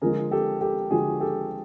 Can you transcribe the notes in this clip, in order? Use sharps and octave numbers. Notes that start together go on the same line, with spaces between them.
D3 F3 G#3 G#4 A#4
G4 A4
G4 A4
D3 F3 G#3 F#4 G#4
G4 A4